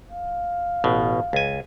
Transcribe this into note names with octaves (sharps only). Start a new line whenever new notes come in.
F5
A1 B2
C#2 G#5